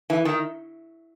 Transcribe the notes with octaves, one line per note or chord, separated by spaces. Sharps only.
E3
D#3